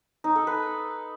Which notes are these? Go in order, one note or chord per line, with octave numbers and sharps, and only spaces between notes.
D#4
A4
B4